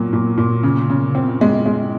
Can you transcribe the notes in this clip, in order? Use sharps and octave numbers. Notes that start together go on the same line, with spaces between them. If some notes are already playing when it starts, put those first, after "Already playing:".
Already playing: A#2 F#3
A#2
A#2
C#3
C#3
C4
G#3
G#3